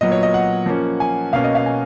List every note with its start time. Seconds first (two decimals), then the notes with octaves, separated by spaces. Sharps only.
0.01 A#2 F#3 B3 D#5
0.12 C#5
0.23 D#5
0.34 F#5
0.66 F3 A#3 C#4
1.00 G#5
1.33 B2 A#3 C#4 F5
1.44 D#5
1.55 F5
1.66 G#5